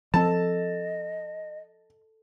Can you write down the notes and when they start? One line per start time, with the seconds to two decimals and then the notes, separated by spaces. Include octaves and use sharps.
0.14 F3 C4 A4 D#5 A5